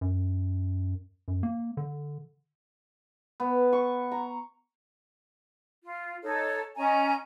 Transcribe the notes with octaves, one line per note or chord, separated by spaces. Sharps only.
F#2
F#2
A#3
D3
B3
C#6
A#5
F4
D#4 A4 C#5
C#4 D#5 G#5 A#5